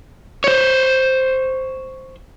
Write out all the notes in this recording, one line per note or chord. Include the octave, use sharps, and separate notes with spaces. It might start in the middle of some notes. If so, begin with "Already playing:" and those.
C5 C#5